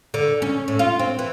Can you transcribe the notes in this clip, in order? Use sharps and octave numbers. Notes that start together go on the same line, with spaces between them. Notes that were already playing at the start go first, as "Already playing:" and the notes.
D3
C#4
A2
F4
C4
E3